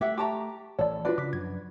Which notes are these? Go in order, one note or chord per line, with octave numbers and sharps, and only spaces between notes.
A3 G4 E5 F#5
G4 A5 A#5 C6 C#6
A1 E3 F3 A4 C#5 D5
D4 F4 F#4 B4 D5
C#3 D6 B6
F#2 F3 G#6